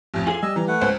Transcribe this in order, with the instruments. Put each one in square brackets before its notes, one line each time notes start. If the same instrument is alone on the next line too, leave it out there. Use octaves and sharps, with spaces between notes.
[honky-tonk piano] A1 F2
[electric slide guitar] F4 G#4 A4 [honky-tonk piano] G#5
[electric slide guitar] G3 [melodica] D#5 E6
[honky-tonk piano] E3 [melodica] A#5
[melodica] A3 B4 F#5
[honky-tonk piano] C#2 [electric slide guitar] C5